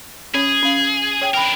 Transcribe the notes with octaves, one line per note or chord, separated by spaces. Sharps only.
C#4 G#4 C#5
C#4 F5
C#5 G5
D4 A#4 G5 B5